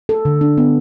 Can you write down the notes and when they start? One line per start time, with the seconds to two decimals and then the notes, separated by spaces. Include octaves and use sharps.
0.09 A4
0.25 D3
0.41 D4
0.58 B3